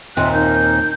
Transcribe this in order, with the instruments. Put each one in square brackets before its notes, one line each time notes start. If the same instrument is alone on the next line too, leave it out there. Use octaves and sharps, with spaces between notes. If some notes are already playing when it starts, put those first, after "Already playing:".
[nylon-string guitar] D#2 A#2 C4 [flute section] E5 C6 F#6
[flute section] D#4 A#4 G6